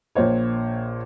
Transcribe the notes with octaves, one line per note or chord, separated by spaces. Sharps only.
A#1 A#2 C5 C#5